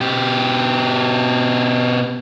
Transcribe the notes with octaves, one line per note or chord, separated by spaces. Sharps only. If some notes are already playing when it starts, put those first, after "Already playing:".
B2 G4